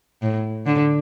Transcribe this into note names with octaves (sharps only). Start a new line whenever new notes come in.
A2
D3